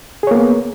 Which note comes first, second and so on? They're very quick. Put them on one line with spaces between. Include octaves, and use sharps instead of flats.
G#4 C#5 A#3 B3